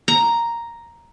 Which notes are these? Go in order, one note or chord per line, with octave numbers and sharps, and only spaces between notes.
A#5